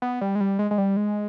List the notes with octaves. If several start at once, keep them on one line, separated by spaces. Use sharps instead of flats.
B3
G3
G#3
G3
G#3
G#3
G3
G#3